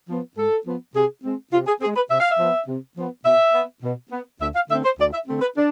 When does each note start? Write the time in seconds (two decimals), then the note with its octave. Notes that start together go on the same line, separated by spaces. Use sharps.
0.09 F3 B3
0.37 G#2 A4
0.66 F3 B3
0.95 C3 G#4
1.24 G#3 C4
1.52 C3 F4
1.67 G#4
1.81 C4 G#4
1.86 G#3
1.96 B4
2.10 C3 E5
2.20 F5
2.31 E5
2.39 F3 B3
2.68 C3
2.97 F3 B3
3.25 B2 E5
3.54 B3
3.83 B2
4.12 B3
4.40 D2 E5
4.55 F5
4.70 D3 A3 C4 E5
4.84 C5
4.99 D2 D5
5.13 E5
5.28 D3 A3 C4
5.41 B4
5.56 D4